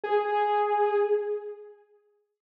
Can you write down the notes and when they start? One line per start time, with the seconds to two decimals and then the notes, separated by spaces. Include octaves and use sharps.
0.04 G#4